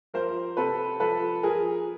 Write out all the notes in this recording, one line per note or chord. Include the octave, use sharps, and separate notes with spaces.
F3 A#4 C5
C3 A4 B4
F3 A4 B4
F3 G#4 A#4